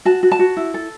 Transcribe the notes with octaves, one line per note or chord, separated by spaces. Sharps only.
F#4 A5
F#4
A5
F#4
E4
A4